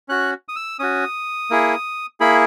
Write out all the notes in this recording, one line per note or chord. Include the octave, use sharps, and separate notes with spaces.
C#4 F#4 F#6
D#6
E6
C#4 F#4 D#6
A#3 E4 G#4
A#3 E4 G#4 B5